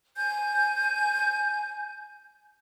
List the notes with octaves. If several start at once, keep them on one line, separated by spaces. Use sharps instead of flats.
G#5 G6